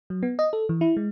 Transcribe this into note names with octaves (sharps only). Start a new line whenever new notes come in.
F#3
B3
D#5
A4
E3
E4
G#3